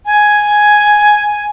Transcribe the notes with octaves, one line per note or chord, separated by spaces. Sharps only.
G#5